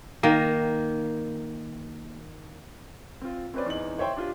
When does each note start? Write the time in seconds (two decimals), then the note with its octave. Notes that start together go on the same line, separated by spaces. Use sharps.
0.23 D#3 A#3
3.21 C4 F4
3.54 C4 C#4 B4 C5 D5
3.66 E2 D#4 F#7
3.98 C5 C#5 E5 G5 C6
4.17 D4 F4 G4